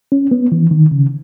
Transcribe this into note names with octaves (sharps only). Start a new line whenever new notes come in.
C#4
B3
E3
D#3
C#3